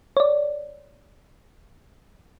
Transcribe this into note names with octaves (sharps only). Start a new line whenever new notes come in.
C#5 D5